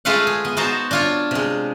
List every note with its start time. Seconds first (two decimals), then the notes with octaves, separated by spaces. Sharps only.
0.05 G#3 A3 F4 B4 F5 F#5
0.27 G#4
0.45 B3
0.57 B3 D#4 F#4 C5 A5 A#5
0.91 D4 F4 C#5
1.31 C3 G#3